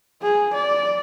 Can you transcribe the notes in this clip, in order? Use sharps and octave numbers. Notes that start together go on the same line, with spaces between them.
G#4
D5